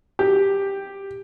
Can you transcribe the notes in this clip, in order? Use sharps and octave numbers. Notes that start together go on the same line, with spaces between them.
G4